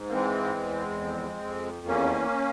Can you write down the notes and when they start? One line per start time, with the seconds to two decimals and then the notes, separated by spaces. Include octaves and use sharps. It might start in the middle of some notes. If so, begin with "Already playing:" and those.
Already playing: G#2
0.09 A#3
0.12 E3 G#3 C4
0.57 E2
1.00 F2
1.43 F2
1.86 E2 A#3 C#4